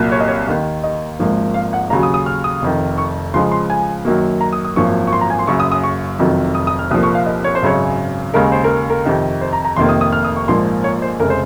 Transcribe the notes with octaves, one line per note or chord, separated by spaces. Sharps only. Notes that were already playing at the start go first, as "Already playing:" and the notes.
Already playing: C2 A#2 F#3 A#3
C#5
D#5
C#5
D#2 D#3 A#3
D#5
G#1 G#2 F3 A#3
F5
F#5
D#2 C#3 F#3 A#5
D#6
D#6
F6
D#6
F1 F2 D#3
C#6
C#2 C#3 F3 G#3 C6
C6
G#5
F#2 D#3 F#3 A#3
A#5
D#6
D#6
G#1 F#2 F3 A#3 C#6
C#6
C6
A#5
G#5
C6
F#1 F#2 C#3 C#6
D#6
D#6
C#6
F1 F2 D#3 F#3
D#6
D#6
F6
C2 A#2 F3 A#3 D#6
C#6
F5
D#5
C#5
C5
G#1 F#2 C#3 G#3 C#5
D#2 C#3 G#3 A#4
C5
A#4
A#4
F2 C3 D#3
C5
A#5
A#5
F1 F2 C3 D#3 A#3 C6
D#6
D#6
F6
D#6
C#6
A#1 G#2 F3 A#3 C6
C#5
C5
F1 C#3 G#3 A#4
C5